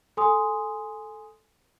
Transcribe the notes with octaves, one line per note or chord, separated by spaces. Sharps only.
A4 G#5 C6 D#6